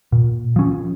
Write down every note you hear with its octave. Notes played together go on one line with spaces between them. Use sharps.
A#2
F3 C#4